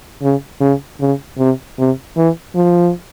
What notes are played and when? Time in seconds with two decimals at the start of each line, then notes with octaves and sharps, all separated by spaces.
0.22 C#3
0.61 C#3
1.01 C#3
1.39 C3
1.79 C3
2.17 E3
2.55 F3